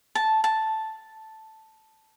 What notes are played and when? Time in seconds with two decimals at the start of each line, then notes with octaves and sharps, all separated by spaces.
0.15 A5
0.44 A5